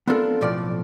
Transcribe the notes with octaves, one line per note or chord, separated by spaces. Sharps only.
B3 C4 D4 F4 A4 A#4
B1 A2 F3 D5